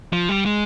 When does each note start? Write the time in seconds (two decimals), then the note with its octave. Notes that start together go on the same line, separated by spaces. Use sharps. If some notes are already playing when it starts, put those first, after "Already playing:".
0.13 F3
0.29 G3
0.46 G#3